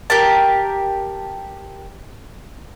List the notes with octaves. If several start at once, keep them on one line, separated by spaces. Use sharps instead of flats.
G4 A#4 A5